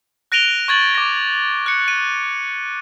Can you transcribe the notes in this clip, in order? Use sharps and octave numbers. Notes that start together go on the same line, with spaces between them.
F#6 A#6 D7 D#7 F7 G7
C#6 G#6 A6 F#7
D6 A#6
F#6 C#7
D#7